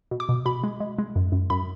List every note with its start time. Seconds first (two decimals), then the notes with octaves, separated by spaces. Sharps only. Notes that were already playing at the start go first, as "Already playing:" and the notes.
0.11 B2
0.20 D6
0.29 B2
0.45 B2 B5
0.64 G#3
0.80 G#3
0.98 G#3
1.16 F#2
1.32 F#2
1.50 F#2 B5